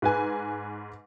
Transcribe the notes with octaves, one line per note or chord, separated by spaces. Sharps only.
G#2 B4 G#5